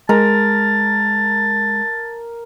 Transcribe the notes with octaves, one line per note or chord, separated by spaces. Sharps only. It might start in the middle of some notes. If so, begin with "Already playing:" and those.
G#3 A#4 A5